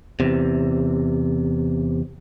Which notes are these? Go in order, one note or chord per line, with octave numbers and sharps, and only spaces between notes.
E2 C3